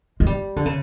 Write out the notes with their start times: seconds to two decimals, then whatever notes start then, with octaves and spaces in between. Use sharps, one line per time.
0.20 G#3
0.26 G3
0.56 D3
0.66 C#3